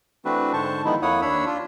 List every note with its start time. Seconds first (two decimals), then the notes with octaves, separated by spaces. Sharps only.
0.25 E3 A3 C4 D4 F#4 B4
0.53 G#2 D3 C5 A5 C#6
0.85 D#3 F3 G#3 B3 D#4 E4
1.02 F2 A#3 E4 C#5 F#5 D#6
1.22 D#2 D4 C#5 B5 E6
1.46 D4 F4